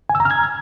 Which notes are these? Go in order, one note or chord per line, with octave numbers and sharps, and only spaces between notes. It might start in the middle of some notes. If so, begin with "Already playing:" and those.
G#5
E6
A#5
F6
G#6